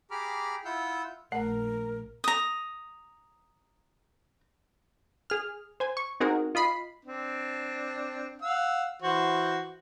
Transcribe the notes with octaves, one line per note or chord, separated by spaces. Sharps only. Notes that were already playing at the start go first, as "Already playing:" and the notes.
G4 G#4 A#5 B5 D6 F6
E4 F4 F#5 E6 G6
A#1 A3 A#4 B4 F#5
A#5 D#6
G#4 F6
C5 G#5
C#6
C4 D#4 F#4 G#4 A#4
F4 D#5 B5 C7
C4 D4
F5 F#5 E6
E3 F#4 C5